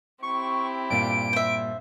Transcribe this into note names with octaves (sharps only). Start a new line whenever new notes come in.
C4 E4 G4 C#6
G2 A#2 D7
C5 E5